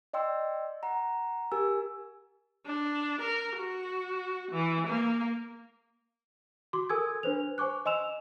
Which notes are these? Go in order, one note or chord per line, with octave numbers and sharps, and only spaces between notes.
D5 D#5 G5 C6 E6
F#5 A#5
G4 A#4 G#5 E6
D4
A#4
F#4
E3
A#3
F#4 C6 D6
A4 A#4 G#5 D#6 E6 G#6
D4 B4 C5 F7
C5 G#5 C#6 D6 F#6
D#5 G#5 C6 E6 E7 F7